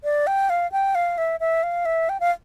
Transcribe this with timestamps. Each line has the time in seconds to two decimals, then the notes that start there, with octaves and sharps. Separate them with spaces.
0.04 D5
0.27 G5
0.50 F5
0.72 G5
0.95 F5
1.18 E5
1.40 E5
1.63 F5
1.85 E5
2.09 G5
2.20 F5